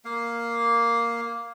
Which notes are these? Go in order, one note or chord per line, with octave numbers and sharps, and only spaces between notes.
A#3 F5